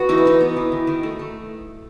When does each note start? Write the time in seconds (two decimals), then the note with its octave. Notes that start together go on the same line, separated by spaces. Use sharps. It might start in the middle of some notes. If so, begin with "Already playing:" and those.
Already playing: B3 F#4
0.09 E3 D#4
0.18 E4
0.25 E3 D#4
0.41 B3
0.57 E3
0.72 D#3
0.87 D#3
1.03 A3
1.19 A3